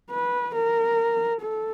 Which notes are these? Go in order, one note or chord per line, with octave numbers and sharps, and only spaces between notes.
B4
A#4
A4